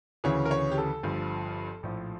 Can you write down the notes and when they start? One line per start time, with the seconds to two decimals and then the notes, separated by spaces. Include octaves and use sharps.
0.24 D2 C#3 E3 C#5
0.45 A#4
0.51 C#5
0.71 G4
0.78 A4
1.03 G1 G2 F3
1.83 A#1 A2 F3